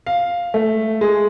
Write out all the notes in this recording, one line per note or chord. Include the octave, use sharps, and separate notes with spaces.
F5
A3
G#3